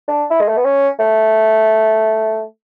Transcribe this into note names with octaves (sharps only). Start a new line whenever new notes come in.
D4
E4
G#3
A3
B3
C#4
A3